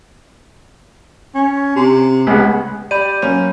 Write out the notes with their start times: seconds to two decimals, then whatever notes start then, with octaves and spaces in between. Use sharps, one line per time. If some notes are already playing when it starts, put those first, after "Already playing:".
1.34 C#4
1.76 C3
2.27 C#2 G#3 B3
2.91 G4 D5 B5 G6 D#7
3.22 F#3 A#3 C#4